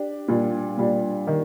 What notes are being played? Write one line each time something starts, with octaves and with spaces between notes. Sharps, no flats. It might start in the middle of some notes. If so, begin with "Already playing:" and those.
Already playing: D4 G4
A#2 G3 D4 F4
A#2 G3 D4 F4
D#3